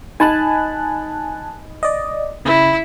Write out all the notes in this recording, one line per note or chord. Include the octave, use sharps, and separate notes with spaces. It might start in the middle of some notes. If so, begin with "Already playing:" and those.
D#4 G#5 A5 B5 F#6
D5 D#5
C#3 E4